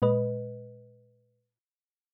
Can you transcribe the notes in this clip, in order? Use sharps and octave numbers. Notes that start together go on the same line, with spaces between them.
A#2 G#3 B4 D#5